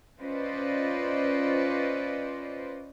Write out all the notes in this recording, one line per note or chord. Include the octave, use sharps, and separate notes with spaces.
C#4 F4 B4 C5 D5 D#5